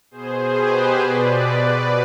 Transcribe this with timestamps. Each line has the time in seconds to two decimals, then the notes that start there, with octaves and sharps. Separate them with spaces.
0.11 B2 G#4 C5
0.55 G4 B4
0.99 B2 B4 D5